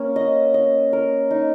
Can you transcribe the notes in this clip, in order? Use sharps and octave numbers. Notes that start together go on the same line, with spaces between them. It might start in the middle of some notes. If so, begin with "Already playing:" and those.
Already playing: A#3 C#4
D#5
D#5
A#4
D#4